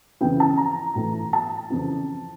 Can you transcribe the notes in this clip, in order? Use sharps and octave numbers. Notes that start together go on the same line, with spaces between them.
F2 C#3 E3 G5
A5
A#5
A2 E3
A5
F2 C#3 E3